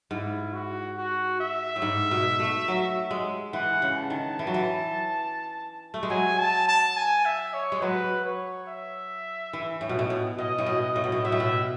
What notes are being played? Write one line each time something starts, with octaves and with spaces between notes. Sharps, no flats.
G#2 E4
F#4
F#4
E5
A2
G#2
B2
A3
F#3
G#3
E3 F#5
C#3
A5
D#3
E3
F#3
E3
A3
G#3
F#3 G#5
A5
A5
G#5
E5
C#5
G#3
F#3 B4
C#5
E5
E3
A2
B2
A2
B2
B2 D#5
A2
B2
D#5
A2
B2
A2
B2 E5
A2
B2